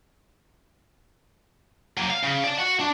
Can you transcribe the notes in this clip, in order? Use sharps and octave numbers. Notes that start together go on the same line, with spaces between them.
F#3 A#3
F5
C#3
D5 A5
F#4 F#5
D4